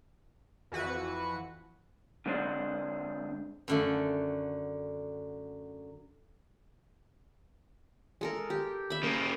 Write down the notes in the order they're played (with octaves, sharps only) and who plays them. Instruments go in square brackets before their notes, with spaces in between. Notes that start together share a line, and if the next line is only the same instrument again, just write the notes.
[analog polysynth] F2 E3 F#4 B4 C#7
[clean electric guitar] D3 G#3 C4 D4 C5
[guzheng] F#2 D3 A3
[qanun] G#3 A4 A#4
G4
E5 B5
[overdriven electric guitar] C#3 A#3